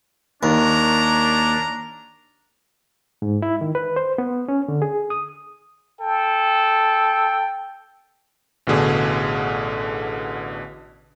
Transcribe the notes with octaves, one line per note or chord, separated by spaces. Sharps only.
D#2 D4 A#4 C#5 A#5
G#2
E4
D#3
B4
C5
B3
C#4
D3
G#4
D#6
A4 G5
A1 B2 D3 G#4